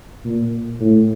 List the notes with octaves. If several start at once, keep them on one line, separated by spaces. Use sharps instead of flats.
A#2
A2